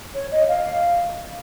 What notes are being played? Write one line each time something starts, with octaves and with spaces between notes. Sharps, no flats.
C#5
D#5
F5